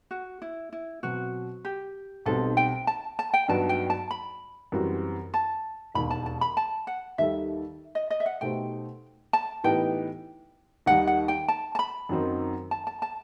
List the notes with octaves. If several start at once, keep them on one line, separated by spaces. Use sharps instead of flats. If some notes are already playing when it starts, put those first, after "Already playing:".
F#4
E4
E4
B2 F#3 C4 F#4
G4
B1 B2 G3 C4 D#4 A4
G5
A5
A5
G5
G2 F#3 B3 D#4 F#4 A5
G5
A5
B5
F#2 E3 G3 C4 F#4
A5
E1 D#2 D#3 B5
A5
A5
B5
A5
F#5
D#2 D#3 G3 D#4 A4 E5
D#5
D#5
E5
F#5
B2 A3 D#4 G4 C5 G5
A5
A2 E3 B3 D#4 G4 G5
D#2 D#3 G3 D#4 F#5
F#5
G5
A5
A5
B5
F#2 D#3 F#3 C4 D#4
A5
A5
A5